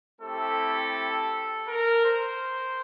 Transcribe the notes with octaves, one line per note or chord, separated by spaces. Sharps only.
A3 C4 E4 G4 A4
A#4
C5